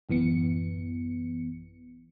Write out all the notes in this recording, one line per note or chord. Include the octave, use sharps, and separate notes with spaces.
A1 F#2 E3 B3 C#7